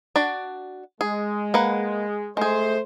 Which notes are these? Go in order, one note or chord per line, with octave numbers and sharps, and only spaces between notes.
D4 F#4 D5
G#3 G#4
A#3 B4 F#5
G#3 A3 G#4 C5